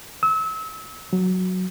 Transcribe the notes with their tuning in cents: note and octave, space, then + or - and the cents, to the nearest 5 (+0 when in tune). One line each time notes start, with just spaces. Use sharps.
E6 -35
F#3 -5